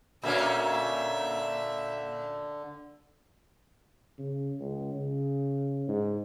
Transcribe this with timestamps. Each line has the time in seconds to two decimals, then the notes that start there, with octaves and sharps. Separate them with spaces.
0.23 A#2 D3 A#3 C#4 E5
4.18 C#3
4.60 C#2
4.94 C#3
5.88 G#2